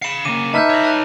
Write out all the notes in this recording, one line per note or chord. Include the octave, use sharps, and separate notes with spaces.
F5 B5 C#7 E7
C#3 A#3 D6 D#7
D#4 B4 E5 A5 F6 G6
C#5 D#5
A5 F#6